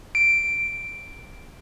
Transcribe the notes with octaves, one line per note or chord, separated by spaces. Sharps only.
D7